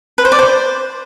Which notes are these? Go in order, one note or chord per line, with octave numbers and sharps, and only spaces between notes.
B4
C5
D5
C5